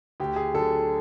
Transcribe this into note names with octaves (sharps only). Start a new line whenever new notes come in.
D2 G4
G#4
D3 F#3 A4